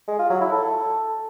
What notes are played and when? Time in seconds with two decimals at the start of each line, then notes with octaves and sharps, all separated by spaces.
0.08 G#3
0.19 F4
0.30 F#3
0.41 E4
0.52 A4